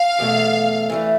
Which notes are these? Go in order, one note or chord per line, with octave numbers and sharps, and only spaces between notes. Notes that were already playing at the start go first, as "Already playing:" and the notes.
Already playing: F5
E2 B2 A3
E3 A3 D4